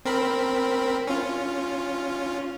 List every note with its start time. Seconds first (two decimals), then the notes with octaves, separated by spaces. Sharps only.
0.05 C4 A#4 B5
1.07 C#4 F4